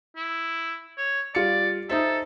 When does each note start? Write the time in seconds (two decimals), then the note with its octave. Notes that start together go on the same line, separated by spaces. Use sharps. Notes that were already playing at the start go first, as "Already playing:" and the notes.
0.17 E4
0.98 C#5
1.35 G3 F4 D5 C#7
1.89 D#4 A4 C5 E5